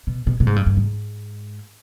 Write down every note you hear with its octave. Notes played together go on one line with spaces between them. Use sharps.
B2
B2
B2
G#2
G2
G2
G#2